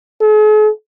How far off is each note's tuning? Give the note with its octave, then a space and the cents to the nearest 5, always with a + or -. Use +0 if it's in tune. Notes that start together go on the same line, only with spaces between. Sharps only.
G#4 +45